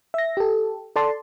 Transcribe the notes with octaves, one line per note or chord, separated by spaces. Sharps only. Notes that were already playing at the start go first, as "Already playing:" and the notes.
E5 A#6
G4 A4
A4 D5 A5 C6